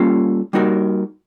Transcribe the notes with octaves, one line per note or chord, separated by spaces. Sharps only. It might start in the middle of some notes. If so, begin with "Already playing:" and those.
Already playing: G3 A#3 C#4 F4 A4
G3 A#3 D#4 F#4 A#4